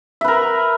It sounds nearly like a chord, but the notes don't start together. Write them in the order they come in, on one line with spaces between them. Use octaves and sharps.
E5 B4 A#4